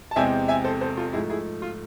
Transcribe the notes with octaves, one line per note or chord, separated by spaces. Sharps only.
A5
E2 C3 G#3 C4 E5 G#5
E5 G#5
A4 C5
A4 C5
F4 A4
G#2 F3 A3 E4 G#4
E4 G#4
F4